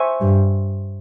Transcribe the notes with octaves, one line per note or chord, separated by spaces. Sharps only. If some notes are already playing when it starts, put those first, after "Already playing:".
Already playing: C5 E5 G#5 C#6
G2